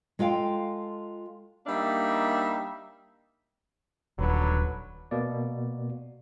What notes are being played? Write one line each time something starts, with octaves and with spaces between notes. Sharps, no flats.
G#3 F4 A4 F5 G5
G3 A#3 D4 D#4 E5
D#1 D3 F#3 B4
B2 A#3 D5